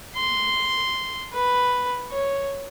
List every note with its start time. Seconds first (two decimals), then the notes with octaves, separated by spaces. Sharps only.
0.16 C6
1.33 B4
2.11 C#5